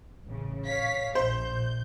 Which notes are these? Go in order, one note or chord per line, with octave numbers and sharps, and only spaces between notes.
A1 C#3
C#5 F5 B6
A#1 C5 G6